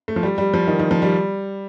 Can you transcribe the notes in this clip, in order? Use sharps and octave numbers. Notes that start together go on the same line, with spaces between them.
A3
F3
G3
G3
F3
D#3
D#3
F3
G3